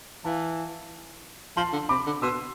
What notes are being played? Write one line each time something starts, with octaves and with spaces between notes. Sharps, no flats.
E3 F5 A5
F3 A5 C6
D3
C3 B5 D6
D3
B2 C6 E6